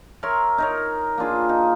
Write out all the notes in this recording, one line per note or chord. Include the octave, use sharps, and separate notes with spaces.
A#4 C#5 E5 C6
D#4 A#4 C#5
A#3 D4 F4 G#4
D#4